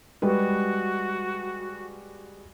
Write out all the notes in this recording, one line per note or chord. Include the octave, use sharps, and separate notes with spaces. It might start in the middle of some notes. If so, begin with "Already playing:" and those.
G3 G#3 F#4 B4